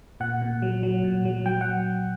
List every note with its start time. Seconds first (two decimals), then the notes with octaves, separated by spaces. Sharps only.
0.20 A#2 F#5
0.42 A#2
0.62 F#3
0.83 F#3
1.04 A#2
1.25 F#3
1.46 F#3 G5
1.61 F#5